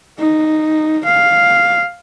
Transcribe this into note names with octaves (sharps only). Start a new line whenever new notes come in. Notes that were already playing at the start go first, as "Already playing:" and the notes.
D#4
F5